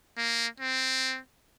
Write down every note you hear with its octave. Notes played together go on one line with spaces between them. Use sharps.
A#3
C4